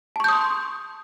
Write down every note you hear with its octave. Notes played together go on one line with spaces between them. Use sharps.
A5 C6 C#6 D#6 G6